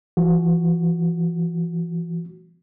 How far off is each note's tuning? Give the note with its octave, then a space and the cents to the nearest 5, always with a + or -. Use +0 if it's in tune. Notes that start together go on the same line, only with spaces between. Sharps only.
E3 +40 F#4 +0